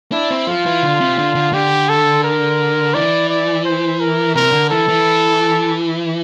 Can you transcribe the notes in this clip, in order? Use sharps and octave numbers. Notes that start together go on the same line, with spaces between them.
D4 E4
C4
F3 F4
E3
D3
C3
D3
D3
D3 G4
A4
A#4
E3 D5
D5
C5
A#4
C3 A#4
D3
E3 A4
E3